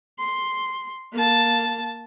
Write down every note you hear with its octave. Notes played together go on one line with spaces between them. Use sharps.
C6
A#3 A5